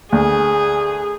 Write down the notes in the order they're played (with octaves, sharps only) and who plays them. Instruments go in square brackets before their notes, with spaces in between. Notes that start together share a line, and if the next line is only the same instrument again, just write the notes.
[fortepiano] D2 [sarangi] G#4